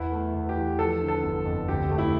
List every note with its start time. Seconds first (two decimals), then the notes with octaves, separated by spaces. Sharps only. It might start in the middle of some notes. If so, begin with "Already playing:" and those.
Already playing: E2 E4
0.12 A3
0.34 E2
0.49 G4
0.57 E3
0.79 F3 A4
1.01 D3
1.08 A4
1.23 G1
1.45 F2
1.68 D2 G4
1.91 A3
1.98 E4